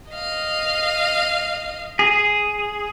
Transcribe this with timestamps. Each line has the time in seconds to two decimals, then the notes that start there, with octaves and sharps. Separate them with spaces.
0.11 D#5 F5
1.99 G#4